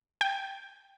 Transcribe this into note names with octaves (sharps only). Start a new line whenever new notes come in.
G5